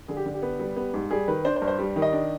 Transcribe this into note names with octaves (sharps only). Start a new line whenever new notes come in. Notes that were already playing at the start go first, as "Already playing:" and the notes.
D3 G#4
G4
D3
G4
B3
G3
B3
G#2
G3 G#4
D#3 B4
D4 C5
C5
G2
C5
G3
D#3
D#5
D4